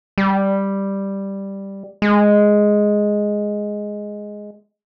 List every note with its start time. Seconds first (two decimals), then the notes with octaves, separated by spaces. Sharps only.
0.18 G3
2.02 G#3